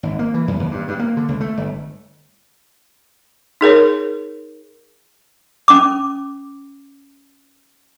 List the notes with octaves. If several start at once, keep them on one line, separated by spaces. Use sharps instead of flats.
G#1
A#3
E3
F#2
D#2
G2
G2
A#3
D3
C#2
A3
G1
D#4 G#4 A#4 C#5
C#4 D6